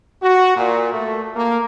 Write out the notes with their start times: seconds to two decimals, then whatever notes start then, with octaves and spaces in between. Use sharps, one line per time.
0.23 F#4
0.56 A#2
0.93 A3
1.36 A#3